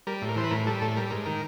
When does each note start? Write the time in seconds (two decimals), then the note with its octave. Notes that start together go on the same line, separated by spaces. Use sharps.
0.07 G3 A#4
0.22 A2
0.29 A#4
0.36 E3 C5
0.44 B4
0.51 A2 A#4
0.67 G3 A4
0.81 A2 A4
0.97 G3 A#4
1.11 G#2 A#4
1.25 D#3 A#4